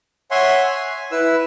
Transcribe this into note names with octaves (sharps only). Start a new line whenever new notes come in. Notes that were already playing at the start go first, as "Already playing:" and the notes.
C#5 E5 F#5 G#5 C6
G#5
E4 B4 E6